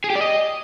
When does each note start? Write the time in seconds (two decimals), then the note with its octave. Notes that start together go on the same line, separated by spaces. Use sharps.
0.04 G#4
0.10 G4
0.15 D5
0.21 D#5